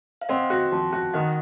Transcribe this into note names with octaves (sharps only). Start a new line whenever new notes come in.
F5
C4 D#5 F#5
F#4
F3
F#4
D#3 D#5 F#5